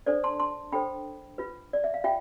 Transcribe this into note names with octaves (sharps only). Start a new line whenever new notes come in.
D4 A4 C5 D5
A5 C6
A5 C6
D4 A4 C5 G5 B5
F4 B4
D5
E5
F5
F4 E5 G5